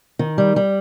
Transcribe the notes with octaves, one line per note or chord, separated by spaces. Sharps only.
D#3
G3
G3